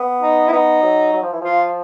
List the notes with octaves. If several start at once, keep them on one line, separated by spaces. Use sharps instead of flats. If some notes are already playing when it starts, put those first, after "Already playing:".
Already playing: B3
D#4
E4
B3 D#4
F#3
F#3
F3
E3
F3 F4